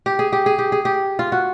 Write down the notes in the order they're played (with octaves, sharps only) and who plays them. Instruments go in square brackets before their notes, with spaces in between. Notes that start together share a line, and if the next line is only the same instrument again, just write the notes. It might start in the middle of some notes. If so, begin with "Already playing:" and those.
[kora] G4
G#4
G4
G#4
G4
G#4
G4
F4
F#4